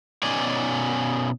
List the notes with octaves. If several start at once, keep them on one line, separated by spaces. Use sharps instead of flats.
B2 C#4 D#4 D5 G#5